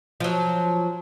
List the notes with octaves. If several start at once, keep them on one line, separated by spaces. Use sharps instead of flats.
F3 F#3